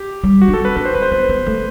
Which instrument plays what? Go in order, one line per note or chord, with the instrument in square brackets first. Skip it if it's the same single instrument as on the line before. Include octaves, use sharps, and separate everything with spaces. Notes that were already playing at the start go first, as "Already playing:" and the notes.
Already playing: [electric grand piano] G4
[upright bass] G3
[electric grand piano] F#4
[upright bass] D4
[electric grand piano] A4
[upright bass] C4
[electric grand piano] B4
[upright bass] D4 [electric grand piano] B4
[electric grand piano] C5
[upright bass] C4 [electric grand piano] B4
[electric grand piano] C5
[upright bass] B3 [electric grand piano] B4
[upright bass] B3
A3